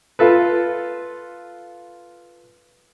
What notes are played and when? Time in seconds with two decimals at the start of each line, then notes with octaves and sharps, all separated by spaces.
0.19 F4 A4 B4